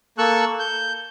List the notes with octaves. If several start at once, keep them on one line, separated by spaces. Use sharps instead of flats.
A#3 A4 C#6 E6 F#6
G6